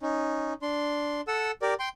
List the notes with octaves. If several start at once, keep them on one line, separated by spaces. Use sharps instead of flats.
C#4 D#4
D4 C6
A4 F#5 E6
G4 A#4 D5
G5 C6